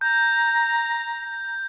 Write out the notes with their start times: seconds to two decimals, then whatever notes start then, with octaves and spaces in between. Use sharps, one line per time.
0.01 A#5 G6